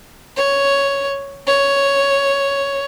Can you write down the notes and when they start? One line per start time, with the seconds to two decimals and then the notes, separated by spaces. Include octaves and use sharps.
0.37 C#5
1.47 C#5